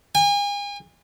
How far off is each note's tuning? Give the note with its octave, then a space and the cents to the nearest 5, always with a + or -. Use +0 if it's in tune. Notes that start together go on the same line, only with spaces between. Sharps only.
G#5 -40